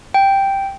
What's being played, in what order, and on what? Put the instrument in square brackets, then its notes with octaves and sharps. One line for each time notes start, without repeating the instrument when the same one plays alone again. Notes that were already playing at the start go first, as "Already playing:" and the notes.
[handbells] G5